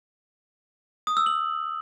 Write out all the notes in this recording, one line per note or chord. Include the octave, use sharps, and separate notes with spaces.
D#6
E6
F#7